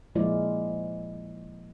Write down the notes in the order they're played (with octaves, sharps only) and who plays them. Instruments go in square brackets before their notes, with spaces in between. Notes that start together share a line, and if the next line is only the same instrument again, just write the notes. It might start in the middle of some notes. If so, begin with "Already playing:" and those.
[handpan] A#2 F3 G#3 E4 F4 D5